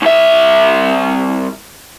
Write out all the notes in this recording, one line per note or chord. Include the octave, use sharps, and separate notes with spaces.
C2 E5